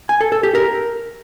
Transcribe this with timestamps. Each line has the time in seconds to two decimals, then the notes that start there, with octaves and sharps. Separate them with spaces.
0.09 G#5
0.21 A4
0.32 A4
0.43 G4
0.55 A#4